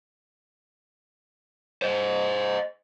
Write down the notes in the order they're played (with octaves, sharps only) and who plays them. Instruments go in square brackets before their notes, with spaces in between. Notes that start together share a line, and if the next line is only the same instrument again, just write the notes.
[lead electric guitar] C5 D#5